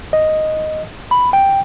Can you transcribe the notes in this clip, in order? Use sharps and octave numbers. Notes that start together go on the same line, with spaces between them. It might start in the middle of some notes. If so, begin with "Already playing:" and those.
D#5
B5
G5